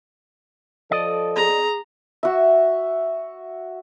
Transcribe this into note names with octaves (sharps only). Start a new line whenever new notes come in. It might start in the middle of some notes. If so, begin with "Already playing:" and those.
F3 A4 D5 D#5
G#4 A#5
F#4 E5